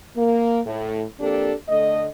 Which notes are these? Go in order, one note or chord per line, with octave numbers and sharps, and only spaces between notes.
A#3
A2
F2 A#3 D4 G4 A4
D3 A3 D#5